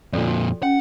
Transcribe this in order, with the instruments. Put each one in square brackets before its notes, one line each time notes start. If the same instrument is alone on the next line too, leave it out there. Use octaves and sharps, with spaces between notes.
[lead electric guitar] F2 A#2 [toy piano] F4 A4 D5
[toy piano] F#4
[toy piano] C#4 [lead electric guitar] F#5